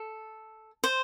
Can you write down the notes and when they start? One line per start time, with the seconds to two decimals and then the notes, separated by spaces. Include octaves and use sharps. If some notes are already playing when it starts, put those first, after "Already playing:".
Already playing: A4
0.84 C5